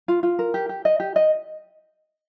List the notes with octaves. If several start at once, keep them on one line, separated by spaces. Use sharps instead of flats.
F4
F4
A#4
G4
G4
D#5
G4
D#5